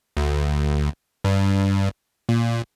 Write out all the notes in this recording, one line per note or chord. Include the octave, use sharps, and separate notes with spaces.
D2
G2
A#2